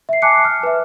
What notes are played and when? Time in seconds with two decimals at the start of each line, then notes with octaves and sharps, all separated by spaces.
0.09 E5 C7
0.22 G#5 A5 D6 F#6 C7 C#7
0.44 F6
0.63 B4 E5